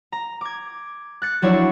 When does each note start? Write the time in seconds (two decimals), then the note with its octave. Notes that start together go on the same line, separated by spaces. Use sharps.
0.12 A#5
0.41 D6 G#6
1.22 F#6 A6 C#7
1.42 F3 F#3 D4 E4 C#5 D5